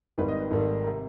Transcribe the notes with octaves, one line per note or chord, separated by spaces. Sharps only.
G#1 G#2 D#3 G3 B4
D#5
B4
G#1 G#2 D#3 G3 A4
C3 A#4